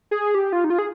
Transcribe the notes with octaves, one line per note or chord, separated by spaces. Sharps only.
G#4
G4
F4
D#4
F4
G#4